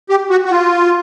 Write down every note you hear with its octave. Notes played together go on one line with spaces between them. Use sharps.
G4
F#4
F#4
F4